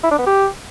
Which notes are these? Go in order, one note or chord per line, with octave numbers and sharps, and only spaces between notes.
E4
D4
B3
G4